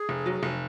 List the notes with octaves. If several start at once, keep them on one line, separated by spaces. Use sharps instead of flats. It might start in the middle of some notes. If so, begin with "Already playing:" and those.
Already playing: G#4
F1
F#3
F1